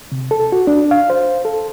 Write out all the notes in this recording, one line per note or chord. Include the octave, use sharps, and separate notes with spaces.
C3
A4
F#4
D4
F5
C5
A4